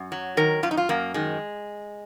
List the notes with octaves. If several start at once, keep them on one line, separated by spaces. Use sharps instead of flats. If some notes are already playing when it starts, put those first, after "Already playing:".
Already playing: F#2
F#3
D#3 A#4
F#2 F4
D#4
F4
F#2 A#3
D#3 G#3